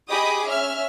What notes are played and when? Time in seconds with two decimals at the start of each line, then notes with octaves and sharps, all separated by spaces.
0.10 G4 G#4 D#5 B5 D6 D#6
0.46 C#4 E5 F6